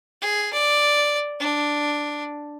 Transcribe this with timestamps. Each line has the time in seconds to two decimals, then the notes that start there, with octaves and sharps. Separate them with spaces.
0.22 G#4
0.53 D5
1.40 D4